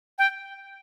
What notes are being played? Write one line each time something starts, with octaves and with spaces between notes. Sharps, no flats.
G5